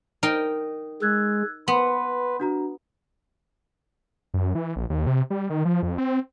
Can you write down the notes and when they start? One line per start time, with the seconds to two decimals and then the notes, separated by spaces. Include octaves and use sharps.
0.23 D#4 A#4 G5
1.02 G#3 E6 F#6 G#6
1.68 B3 B4 C6
2.40 D4 F#4 A#5
4.34 F#2
4.55 E3
4.76 A#1
4.90 D#2
5.07 C3
5.30 G3
5.50 D#3
5.65 F3
5.83 F2
5.98 C4